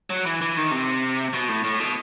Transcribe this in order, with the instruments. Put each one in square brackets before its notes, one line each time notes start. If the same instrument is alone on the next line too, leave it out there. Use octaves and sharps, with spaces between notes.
[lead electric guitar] F#3
E3
E3
D#3
C3
B2
A2
A2
B2